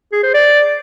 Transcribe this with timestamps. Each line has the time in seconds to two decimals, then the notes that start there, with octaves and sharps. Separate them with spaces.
0.12 G#4
0.23 C5
0.34 D5